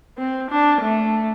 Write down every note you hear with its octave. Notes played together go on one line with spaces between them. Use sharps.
C4
D4
A3